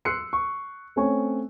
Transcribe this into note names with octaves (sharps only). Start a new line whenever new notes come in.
C6 E6 F#6 C7 C#7
C#6
A3 C4 C#4 C#5 G#5 C#6